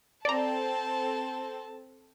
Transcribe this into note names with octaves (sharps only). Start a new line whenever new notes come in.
C4 A4 D5 A5 A#5